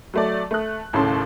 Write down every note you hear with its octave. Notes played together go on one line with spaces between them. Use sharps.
F#3 A3 D5
A3 F#6
D#2 A2 C#3 C#4 A4 C6